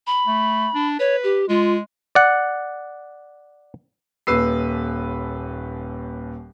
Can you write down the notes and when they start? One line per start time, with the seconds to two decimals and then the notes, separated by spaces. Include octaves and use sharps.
0.07 B5
0.27 A3
0.75 D4
0.99 B4 C#5
1.24 G4
1.49 G#3 F4
2.15 D5 F#5
4.27 D#1 D#2 B4 E6 C7